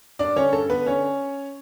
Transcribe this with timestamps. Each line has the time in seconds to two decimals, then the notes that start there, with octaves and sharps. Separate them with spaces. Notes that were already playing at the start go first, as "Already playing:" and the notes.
0.19 G2 D4 D5
0.36 D3 C#4 C#5
0.53 G2 A4
0.70 D3 B3 B4
0.86 D3 C#4 C#5